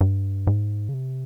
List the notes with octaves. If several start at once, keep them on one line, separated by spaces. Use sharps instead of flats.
G2
G#2
C#3
C3